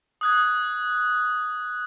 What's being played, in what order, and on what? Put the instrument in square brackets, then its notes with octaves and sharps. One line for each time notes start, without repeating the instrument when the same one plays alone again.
[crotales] D#6 F#6 G#6